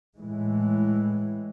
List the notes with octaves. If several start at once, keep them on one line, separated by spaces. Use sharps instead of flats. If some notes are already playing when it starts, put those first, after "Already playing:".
A2 E3 G#3